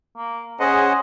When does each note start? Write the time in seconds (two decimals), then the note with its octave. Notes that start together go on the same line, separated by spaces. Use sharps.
0.17 A#3
0.60 C#4 G#4 C5 D#5 F#5